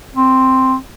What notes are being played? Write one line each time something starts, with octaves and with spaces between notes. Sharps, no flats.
C4